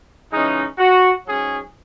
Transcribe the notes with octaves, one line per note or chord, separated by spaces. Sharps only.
C#3 E3 G#3 C#4 D#4
F#4
G#2 F#3 C#4 G#4